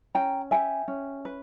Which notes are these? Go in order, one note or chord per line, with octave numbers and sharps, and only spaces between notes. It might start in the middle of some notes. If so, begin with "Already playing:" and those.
C#4 G5 A#5
G4 E5 G#5
C#4
B4